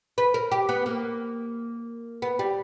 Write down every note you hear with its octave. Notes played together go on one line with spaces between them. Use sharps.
B4
A#4
G4
B3
A#3
B3
G3